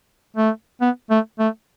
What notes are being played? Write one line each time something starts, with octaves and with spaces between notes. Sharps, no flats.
A3
B3
A3
A3